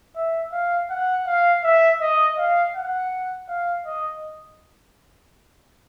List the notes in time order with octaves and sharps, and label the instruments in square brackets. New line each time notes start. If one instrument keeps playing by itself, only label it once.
[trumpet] E5
F5
F#5
F5
E5
D#5
F5
F#5
F5
D#5